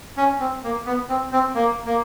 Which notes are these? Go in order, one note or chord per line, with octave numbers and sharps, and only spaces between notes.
C#4
C4
A#3
B3
C4
C4
A#3
A#3